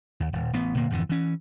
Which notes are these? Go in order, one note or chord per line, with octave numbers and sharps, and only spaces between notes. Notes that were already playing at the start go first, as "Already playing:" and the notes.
D#2
D#1
A1 B3
F1 A#2 D3 A#3
G#1 F2 D3 E3
E3 C#4